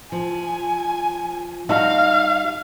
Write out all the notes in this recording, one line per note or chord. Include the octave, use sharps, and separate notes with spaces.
F3 G#5
G3 D#4 F#4 F5